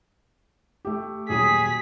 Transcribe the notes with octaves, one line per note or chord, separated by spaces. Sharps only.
A3 G4
D#1 F#3 G#4 D#6 B6